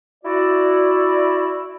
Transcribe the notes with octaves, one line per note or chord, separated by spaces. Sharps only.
E4 F#4 D5